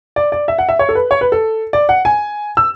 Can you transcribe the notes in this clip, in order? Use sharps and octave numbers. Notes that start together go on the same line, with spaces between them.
D5
D5
E5
F#5
E5
C#5
A4
B4
C#5
B4
A4
D5
F#5
G#5
E6